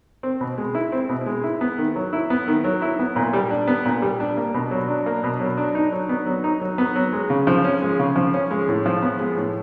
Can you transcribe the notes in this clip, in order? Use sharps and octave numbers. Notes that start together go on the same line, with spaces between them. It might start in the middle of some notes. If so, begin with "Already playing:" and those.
C4
B2
G#3
E4
C4
B2
G#3
E4
B3
D#3
F#3
E4
B3
D#3
F#3
E4
B3
A#2
G3
D4
B3
A#2
G3
D4
A#3
B2
F#3
D4
A#3
B2
F#3
D4
D#4
F#3
B3
F#3
D#4
F#3
B3
F#3
G#3
C#3
F3
C#4
G#3
C#3
F3
C#4
G#3
A2
F3
B3
G#3
A2